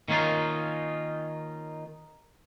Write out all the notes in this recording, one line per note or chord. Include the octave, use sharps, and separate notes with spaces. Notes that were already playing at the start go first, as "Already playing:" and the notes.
D#3 A#3 C#4 D#4 F4